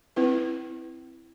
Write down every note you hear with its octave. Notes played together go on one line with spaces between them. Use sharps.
C4 E4 B4